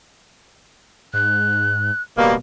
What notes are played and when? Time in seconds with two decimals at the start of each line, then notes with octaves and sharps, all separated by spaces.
1.14 G#2 F#6
2.17 D1 B2 G3 A#3